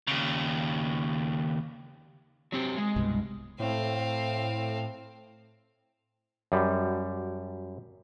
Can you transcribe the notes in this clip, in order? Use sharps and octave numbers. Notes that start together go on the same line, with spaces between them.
D#2 C#3
F#3 C4 G4
G#3
C2 G2 B2
A2 C4 F5
F#2 G3